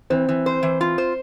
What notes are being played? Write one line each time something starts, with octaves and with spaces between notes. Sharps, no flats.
E3 C4
E3
C5
E3
F4
C5